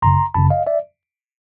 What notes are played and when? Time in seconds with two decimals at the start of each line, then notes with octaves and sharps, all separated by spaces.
0.02 G#1 F#2 C#3 A#5 C6
0.34 G#1 F#2 C#3 A5 B5
0.50 D#5 F5
0.67 D5 E5